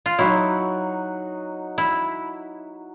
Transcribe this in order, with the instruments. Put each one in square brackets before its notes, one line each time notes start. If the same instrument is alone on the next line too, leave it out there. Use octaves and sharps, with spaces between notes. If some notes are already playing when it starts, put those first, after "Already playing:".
[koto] F4
[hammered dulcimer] F#3 D#4 F#4 [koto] E4
[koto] E4